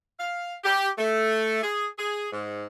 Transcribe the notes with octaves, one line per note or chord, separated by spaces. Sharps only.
F5
G4
A3
G#4
G#4
G#2